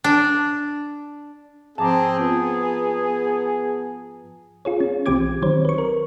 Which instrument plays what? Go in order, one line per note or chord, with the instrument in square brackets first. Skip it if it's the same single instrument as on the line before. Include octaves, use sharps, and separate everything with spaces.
[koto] D4
[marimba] G#2 F3 D6 [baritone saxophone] C4 [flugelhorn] G#4 [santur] A5 A#5
[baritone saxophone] B3 [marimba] F4
[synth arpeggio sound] F4 G#4 C#5
C#4
B1 E3 C4 G4 D6 G#6
D#3 F#3 C4 C5 C#5
B4 C#6
A#4